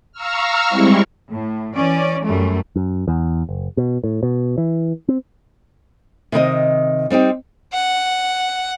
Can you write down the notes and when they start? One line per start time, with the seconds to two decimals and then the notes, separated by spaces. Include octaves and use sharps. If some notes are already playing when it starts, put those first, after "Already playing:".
0.12 F5 A#5 C#6 E6 F6
0.69 G3 G#3 C4 E4 C#6
1.31 A2
1.75 E3 C#4 D5
2.25 F#2 G3 A3
2.76 F#2
3.08 E2
3.49 F#1
3.77 B2
4.04 A2
4.23 B2
4.58 E3
5.08 C4
6.32 C3 D#3 B4 D#5
7.10 G3 C4 D#4 G4
7.73 F#5